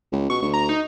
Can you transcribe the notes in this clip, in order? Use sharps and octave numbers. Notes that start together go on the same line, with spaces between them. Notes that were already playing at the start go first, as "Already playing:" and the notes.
C#2
B2 C#6
D2
A#5
D#4